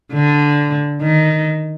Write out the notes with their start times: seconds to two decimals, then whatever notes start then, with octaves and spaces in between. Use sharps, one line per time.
0.13 D3
1.01 D#3